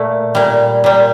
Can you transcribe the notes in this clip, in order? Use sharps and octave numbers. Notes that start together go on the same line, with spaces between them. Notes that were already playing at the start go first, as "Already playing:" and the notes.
Already playing: A#2 A3
A#2 G3
A#2 G3